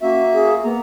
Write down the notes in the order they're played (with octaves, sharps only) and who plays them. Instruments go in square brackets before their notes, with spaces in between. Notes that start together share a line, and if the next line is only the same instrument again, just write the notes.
[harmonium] A#3 F#4 E5 [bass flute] C#4
[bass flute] G#4
[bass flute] A#3 [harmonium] B3 A#5